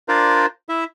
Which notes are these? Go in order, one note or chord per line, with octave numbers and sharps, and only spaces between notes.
D4 F4 A#4 C5 D5
E4 E5